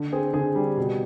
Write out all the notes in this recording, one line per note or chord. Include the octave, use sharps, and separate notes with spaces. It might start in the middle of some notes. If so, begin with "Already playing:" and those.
Already playing: D3
C4 G#4
D3 G#4
G3
B2